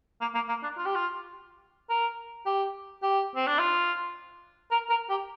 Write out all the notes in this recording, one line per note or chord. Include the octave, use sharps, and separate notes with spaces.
A#3
A#3
A#3
D4
F4
G4
F4
A#4
G4
G4
C4
D4
F4
A#4
A#4
G4